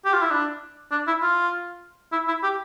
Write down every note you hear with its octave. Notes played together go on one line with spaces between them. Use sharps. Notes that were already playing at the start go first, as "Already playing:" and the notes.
G4
F4
E4
D4
D4
E4
F4
E4
E4
G4